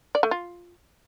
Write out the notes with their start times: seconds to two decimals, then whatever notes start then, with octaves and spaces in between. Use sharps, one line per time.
0.15 D5
0.23 A3
0.31 F4